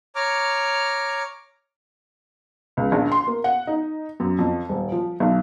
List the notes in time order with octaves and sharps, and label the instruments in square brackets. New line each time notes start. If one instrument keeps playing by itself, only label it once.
[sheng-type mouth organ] C#5 A#5 D6 F6
[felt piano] C#2
A#1
C6
A#3
F#5
D#4
F#2
F2
D#1
F3
B1